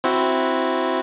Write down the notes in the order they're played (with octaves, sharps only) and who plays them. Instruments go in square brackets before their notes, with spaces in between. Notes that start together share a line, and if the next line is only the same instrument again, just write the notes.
[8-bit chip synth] C4 E4 F#4